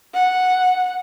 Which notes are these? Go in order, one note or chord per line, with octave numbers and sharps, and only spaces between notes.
F#5